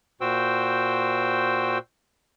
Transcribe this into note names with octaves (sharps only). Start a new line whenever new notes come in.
A#2 F#4 C5 G5 E6